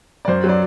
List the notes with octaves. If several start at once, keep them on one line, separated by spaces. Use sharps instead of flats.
D5
F#2 C5
F#3
D5